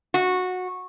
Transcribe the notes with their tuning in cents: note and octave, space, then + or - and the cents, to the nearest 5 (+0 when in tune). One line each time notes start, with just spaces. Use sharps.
F#4 -15